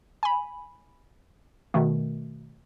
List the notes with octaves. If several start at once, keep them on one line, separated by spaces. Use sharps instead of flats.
G#5 B5
B2 D#3 A3